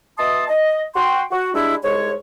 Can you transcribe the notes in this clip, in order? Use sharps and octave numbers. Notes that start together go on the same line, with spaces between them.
B2 D#5 E5 A5 C6 D#6
D#5
F#4 G5 C6
F#4
G3 G#3 D4 E4
C2 G#2 G#3 C#5